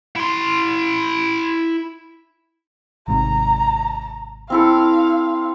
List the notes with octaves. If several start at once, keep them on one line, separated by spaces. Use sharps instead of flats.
E4 C6
G#1 G#2 C3 A#5
C4 E4 A4 F5